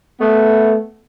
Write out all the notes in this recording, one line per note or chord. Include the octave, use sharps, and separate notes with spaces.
A3 B3